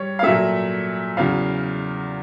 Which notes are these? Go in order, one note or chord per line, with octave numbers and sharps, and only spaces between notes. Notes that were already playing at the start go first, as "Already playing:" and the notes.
Already playing: G3 C#5
F5
A#2 F#3 A3 E5
E2 C#3 F#3 F5